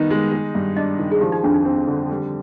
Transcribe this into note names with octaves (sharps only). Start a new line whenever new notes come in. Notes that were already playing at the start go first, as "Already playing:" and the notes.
Already playing: D#3 G3 B3 D#4
G#3
G#3
G2
D4 D#5
D#3
G#4
F3 G4
D#4
F2 D4
D#4
C4 D4
D3
G3